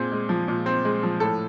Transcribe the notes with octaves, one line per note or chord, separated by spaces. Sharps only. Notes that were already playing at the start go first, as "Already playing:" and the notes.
Already playing: A#2 C4 G#4
G#3
F3
A#2
C4
G#3
F3
A2 A4